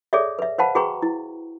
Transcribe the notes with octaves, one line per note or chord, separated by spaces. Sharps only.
G#4 A4 C#5 D5 E5
B4 E5
B4 C5 F5 F#5 A5 B5
F#4 G#4 B4 G5 A#5 C#6
E4